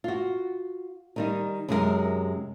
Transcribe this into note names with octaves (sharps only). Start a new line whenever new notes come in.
F4 F#4
D#3 G3 D#4
F#2 C3 G#3 D#4 F#4 A#4